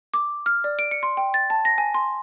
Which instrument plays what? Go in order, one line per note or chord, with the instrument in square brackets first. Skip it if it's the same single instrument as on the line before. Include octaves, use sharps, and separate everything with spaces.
[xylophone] D6
F6
D5
D7
C#7
C6
G5
A6
A5
A#6
G#5
C6